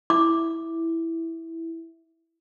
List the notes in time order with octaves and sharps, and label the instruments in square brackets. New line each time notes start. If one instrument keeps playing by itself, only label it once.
[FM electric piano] E4 [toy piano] D6